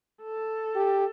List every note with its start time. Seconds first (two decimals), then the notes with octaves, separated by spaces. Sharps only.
0.23 A4
0.76 G4